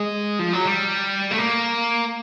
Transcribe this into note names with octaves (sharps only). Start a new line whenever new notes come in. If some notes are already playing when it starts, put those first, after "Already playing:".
Already playing: G#3
F3
F#3
G3
A3
A#3